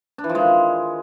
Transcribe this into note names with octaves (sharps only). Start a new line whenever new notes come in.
D4
E3
F3
G#3
D#3